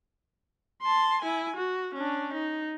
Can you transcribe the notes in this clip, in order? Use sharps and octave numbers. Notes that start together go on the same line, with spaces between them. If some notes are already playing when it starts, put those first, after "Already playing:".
A5 C6
E4 G#5
F#4
C#4 D4
D#4